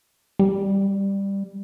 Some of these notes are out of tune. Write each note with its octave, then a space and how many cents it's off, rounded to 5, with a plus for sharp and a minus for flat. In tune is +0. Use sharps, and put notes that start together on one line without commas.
G3 +10